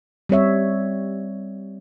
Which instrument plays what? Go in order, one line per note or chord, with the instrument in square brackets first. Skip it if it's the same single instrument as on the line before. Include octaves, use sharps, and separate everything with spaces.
[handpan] G3 C4 C#5 E5